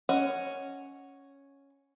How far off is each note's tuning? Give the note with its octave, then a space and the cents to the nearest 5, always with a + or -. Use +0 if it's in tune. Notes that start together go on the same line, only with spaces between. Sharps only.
C#4 +0 D#5 +0 F#5 +0